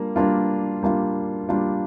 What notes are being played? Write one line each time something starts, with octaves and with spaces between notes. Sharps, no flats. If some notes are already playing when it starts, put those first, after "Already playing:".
Already playing: G3 A#3 D4 F4
G3 A#3 D4 F4
G3 A#3 D4 F4
G3 A#3 D4 F4